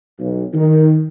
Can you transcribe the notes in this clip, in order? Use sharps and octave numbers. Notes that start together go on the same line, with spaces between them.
B1
D#3